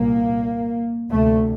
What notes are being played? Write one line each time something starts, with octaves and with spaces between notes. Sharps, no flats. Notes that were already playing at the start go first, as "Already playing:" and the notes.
Already playing: C2 A#2 A#3
D2 C3 A3